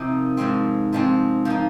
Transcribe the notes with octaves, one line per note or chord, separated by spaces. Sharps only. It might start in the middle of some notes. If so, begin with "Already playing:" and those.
Already playing: C3 F3 A#3 D#4
G#2 F3 G#3 C4
G#2 F3 G#3 C4
F3 A#3 D#4